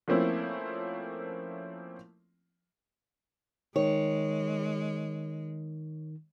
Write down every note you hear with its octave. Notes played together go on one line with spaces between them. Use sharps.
F3 A3 A#3 C4 C#4 E4
D#3 G#3 C#5